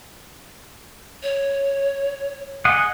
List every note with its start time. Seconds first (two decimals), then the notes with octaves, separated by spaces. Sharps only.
1.23 C#5
2.65 G#4 D#5 F#5